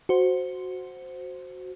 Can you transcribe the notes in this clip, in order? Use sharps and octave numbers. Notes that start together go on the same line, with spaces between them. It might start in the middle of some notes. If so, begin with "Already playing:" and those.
F#4 C5